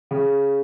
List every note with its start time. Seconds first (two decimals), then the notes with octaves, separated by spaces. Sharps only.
0.11 C#3